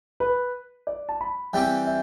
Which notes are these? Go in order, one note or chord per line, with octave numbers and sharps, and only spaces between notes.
B4
D5
A5
B5
E3 G3 C4 G4 G5
E5